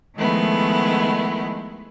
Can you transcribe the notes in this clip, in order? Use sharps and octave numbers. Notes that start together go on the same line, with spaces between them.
D#3 F3 G#3 A3 B3 E4